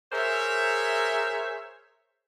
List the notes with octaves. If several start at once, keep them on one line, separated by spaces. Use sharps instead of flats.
G#4 A#4 C5 C#5 E5